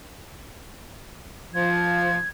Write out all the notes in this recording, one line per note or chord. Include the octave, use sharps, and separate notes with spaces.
F3 G#6